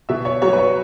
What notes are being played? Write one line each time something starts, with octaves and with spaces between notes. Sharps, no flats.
B2 E5
C#5
F#3 C#5
B4
C#5